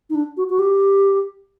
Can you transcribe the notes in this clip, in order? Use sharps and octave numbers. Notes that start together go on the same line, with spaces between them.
D#4
D4
F#4
F#4
G4